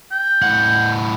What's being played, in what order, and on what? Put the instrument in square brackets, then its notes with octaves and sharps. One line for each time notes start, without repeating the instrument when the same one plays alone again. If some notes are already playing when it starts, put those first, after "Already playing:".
[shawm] G5
[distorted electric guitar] A2 F#5